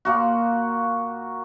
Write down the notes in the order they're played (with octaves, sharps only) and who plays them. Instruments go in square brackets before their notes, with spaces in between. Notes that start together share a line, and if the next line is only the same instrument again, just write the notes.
[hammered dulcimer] A#2 A#3 F#4